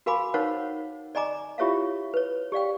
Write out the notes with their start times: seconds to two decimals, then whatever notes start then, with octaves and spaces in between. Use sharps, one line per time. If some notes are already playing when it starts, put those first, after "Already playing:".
0.06 F#4 A#4 F5 G#5 B5 D6
0.34 D#4 A#4 C5 C#5 F5 F#5
1.15 D5 D#5 G#5 A#5 D6
1.58 E4 F4 G4 C#5 E5 F5
2.14 B4 C#5
2.52 G4 D5 F5 G5